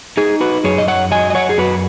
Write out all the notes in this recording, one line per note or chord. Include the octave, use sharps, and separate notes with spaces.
D#4 G#4
F#4 B4
F#2 G#4 C#5
D#5
C#5 F#5
F#3 D#5 G#5
D#5
C#5 F#5
G#4
F#2 F#4 B4